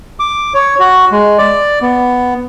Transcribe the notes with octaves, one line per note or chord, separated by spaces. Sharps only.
D6
C#5
F#4
G#3
D5
B3